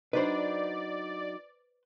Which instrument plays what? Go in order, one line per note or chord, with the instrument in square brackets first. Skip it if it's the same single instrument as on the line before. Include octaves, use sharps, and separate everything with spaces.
[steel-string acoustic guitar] F#3 D4 D#4 [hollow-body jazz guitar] B4 C5 [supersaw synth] D5